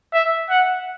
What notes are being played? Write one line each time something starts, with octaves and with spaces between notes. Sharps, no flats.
E5
F#5